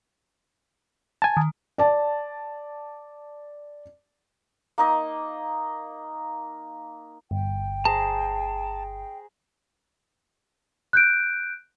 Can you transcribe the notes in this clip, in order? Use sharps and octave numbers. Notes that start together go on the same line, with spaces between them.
G#5 A5
D#3
D5 A5
A#3 D#4 D#5
G1 G5
G#4 C5 A5 A#5
F#6 G6 D7